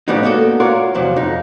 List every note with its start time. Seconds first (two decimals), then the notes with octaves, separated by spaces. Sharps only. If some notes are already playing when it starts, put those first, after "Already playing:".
0.08 A2 C#3 F3 G3 B3 D#4
0.23 A#3 B3 F#4 A4
0.60 F4 F#4 A#4 C#5 D5
0.95 E2 C3 F3 F#3
1.16 F2 D#4